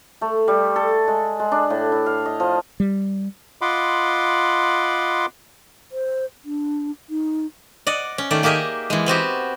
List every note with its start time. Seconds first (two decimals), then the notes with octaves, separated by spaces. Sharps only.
0.21 A3
0.48 G3
0.76 A4
1.08 G#3
1.40 G#3
1.52 D4
1.70 A2
1.92 E4
2.06 F5
2.25 D#5
2.40 F3
2.80 G3
3.62 F4 D#5 F#5 B5 C6 D6
5.92 C5
6.45 D4
7.09 D#4
7.87 D5 D#5 F#5
8.18 C#4
8.31 D#3 A3 D5
8.43 A#3 G4 G#4 A#4 D#5 E5
8.90 E3 G#3
9.06 B3 C4 F#4 G4